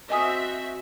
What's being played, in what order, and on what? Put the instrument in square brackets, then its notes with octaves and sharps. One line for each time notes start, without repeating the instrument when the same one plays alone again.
[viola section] C4 F#4 E5 [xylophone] D#5 G#5 D#6